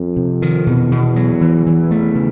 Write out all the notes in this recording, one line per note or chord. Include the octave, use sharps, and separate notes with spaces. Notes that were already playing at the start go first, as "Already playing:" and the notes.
Already playing: F2
C3
D#3
E2 B2
B2
F#3
E3
E3
A3
C#3